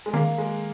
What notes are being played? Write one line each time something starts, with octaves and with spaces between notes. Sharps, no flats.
G#3
D#3 A#3
G#3